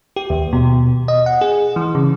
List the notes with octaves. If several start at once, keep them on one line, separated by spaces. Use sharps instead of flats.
G4
D#2
B2
D#5
F#5
G#4
E3
C#3